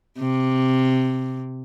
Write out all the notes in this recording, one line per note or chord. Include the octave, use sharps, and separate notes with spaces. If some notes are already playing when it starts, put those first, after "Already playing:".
C3